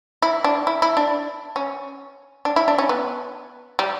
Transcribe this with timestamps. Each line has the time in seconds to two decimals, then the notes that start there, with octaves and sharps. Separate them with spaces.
0.22 E4
0.44 D4
0.67 E4
0.82 E4
0.97 D4
1.56 C#4
2.45 D4
2.56 E4
2.68 D4
2.78 C#4
2.89 B3
3.79 G3